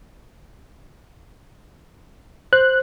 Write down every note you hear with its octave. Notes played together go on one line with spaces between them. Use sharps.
C5 F#6